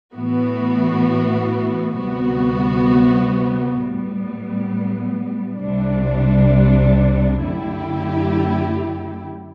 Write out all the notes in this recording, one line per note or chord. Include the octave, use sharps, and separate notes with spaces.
A2 E3 B3 F#4
D2 C3 G3 B3 F#4
A2 G3 B3
C2 C3 G3 D4
F#2 D3 A3 E4 G4